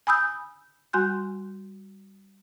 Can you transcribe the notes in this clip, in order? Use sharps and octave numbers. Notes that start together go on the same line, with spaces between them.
G#5 B5 D#6 E6 G6
G3 F#4 G#5 C6 F#6 G6